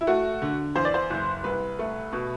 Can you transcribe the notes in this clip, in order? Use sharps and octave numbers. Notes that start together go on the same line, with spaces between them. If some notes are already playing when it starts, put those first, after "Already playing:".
E4
A3 F#4
D3
E2 C5
D5
C5
F#1
C2 B4
A3
B2